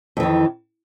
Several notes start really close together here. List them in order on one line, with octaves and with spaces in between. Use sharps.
F2 E3 D#3